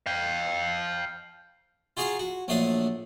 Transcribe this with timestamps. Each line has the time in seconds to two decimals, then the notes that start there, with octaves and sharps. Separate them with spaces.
0.06 F5 G5
1.97 F4 F#4 G#4 F5 A#5 C#6
2.19 F#4
2.48 A#1 F#3 A3 D4 F5 D#6